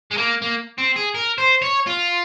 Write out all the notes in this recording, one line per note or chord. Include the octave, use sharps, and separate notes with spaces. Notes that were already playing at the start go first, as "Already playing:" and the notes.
G#3
A#3
A#3
C4
G#4
A#4
C5
C#5
F4